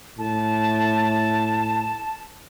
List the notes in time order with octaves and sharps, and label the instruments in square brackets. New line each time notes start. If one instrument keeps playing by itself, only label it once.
[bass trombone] A2 [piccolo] A5